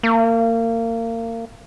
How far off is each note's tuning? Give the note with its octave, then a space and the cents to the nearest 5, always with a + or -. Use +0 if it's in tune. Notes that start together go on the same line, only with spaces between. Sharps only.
A#3 -30